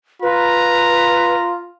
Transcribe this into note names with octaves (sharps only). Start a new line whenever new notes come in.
F4 B4 A#5